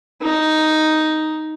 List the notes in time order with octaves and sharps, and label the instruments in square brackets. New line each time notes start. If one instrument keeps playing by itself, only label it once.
[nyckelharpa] D#4